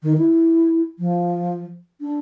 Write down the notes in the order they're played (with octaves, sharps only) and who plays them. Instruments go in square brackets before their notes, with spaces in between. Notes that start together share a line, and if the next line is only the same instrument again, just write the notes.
[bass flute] D#3
E4
F3
D4